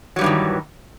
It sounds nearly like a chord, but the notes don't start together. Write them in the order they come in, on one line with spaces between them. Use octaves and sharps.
F#3 G3 G2 E3 D#3